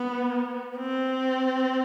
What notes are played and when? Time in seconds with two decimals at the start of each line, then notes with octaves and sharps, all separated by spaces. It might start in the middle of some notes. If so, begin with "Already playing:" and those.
Already playing: B3
0.78 C4